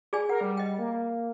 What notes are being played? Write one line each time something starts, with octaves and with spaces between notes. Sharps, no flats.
G#4 D5 G#5
A#4 F#5
G3
D#5 G5
A#3